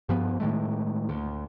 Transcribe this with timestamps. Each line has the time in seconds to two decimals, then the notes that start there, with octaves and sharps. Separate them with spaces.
0.09 G2 F3 B3
0.40 A2 D#3 G#3 A3
1.09 D2